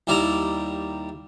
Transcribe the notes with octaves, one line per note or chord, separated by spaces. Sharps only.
D#2 G3 E4 D5 A#5